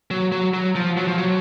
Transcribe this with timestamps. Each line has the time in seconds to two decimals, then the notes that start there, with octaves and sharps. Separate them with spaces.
0.11 F#3
0.32 F#3
0.54 F#3
0.75 F3
0.97 F#3
1.07 F3
1.18 F#3